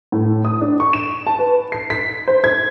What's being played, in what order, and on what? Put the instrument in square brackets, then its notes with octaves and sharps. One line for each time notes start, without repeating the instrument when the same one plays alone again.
[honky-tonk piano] A2
D#6
D4
C#6
E7
A5
B4
C7
B6
C5
G#6